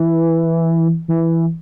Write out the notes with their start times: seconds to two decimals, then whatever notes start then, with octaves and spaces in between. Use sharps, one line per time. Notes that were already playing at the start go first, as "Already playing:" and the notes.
Already playing: E3
1.08 E3